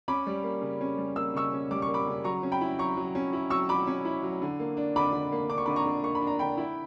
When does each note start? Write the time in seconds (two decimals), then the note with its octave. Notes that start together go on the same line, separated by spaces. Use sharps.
0.08 C#4 B5 D6
0.27 G3
0.43 A#3
0.61 C#3
0.81 C#4
0.98 G3
1.16 A#3 E6
1.34 C#3 C#6 E6
1.53 C#4
1.71 G3 D6
1.82 C#6
1.88 A#3
1.94 B5 D6
2.07 C#3
2.24 F#3 A#5 C#6
2.43 C#4
2.52 G5 B5
2.61 E4
2.79 F#3 A#5 C#6
2.97 F#3
3.15 C#4
3.33 E4
3.50 F#3 C#6 E6
3.69 F#3 B5 D6
3.87 C#4
4.05 E4
4.23 F#3
4.42 D3
4.60 A#3
4.77 D4
4.96 D3 B5 D6
5.13 D3
5.32 A#3
5.49 D4 D6
5.58 C#6
5.66 D3 B5 D6
5.76 A#5 C#6
5.86 D3
6.03 A#3 C#6
6.15 B5
6.22 D4
6.27 A#5
6.39 D3 G5 B5
6.57 E4